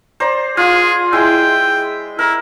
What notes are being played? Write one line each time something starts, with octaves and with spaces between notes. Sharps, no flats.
C5 D5 A#5
F4 G#4
G#3 E4 G5
E4 A#4